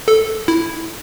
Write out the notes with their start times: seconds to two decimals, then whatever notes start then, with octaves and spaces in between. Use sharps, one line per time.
0.08 A4
0.48 E4